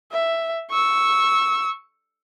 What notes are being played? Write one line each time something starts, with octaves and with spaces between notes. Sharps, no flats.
E5
C#6 E6